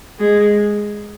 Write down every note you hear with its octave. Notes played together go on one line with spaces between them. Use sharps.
G#3